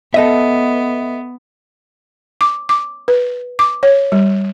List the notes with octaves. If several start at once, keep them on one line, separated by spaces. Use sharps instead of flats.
B3 A4 D#5 E5
D6
D6
B4
D6
C#5
G3